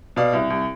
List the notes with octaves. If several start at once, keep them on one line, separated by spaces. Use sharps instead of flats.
B2 D5 F5
C2
C2